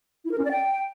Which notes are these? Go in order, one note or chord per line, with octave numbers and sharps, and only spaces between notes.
E4
A#4
C#4
D5
G5